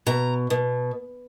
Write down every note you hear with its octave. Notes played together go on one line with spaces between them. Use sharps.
B2 A#5
B2